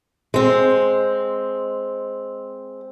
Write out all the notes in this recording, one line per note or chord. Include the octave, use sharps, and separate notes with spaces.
G#3 C4